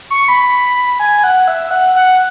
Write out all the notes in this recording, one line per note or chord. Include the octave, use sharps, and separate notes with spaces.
C#6
B5
G#5
F#5
E5
F#5
F#5